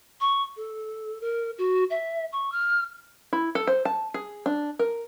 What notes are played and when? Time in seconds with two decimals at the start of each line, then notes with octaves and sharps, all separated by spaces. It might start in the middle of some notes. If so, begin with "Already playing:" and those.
0.21 C#6
0.57 A4
1.21 A#4
1.58 F#4
1.90 E5
2.32 C#6
2.52 F6
3.33 E4
3.55 A4
3.67 C5
3.85 A5
4.14 G#4
4.46 D4
4.79 A#4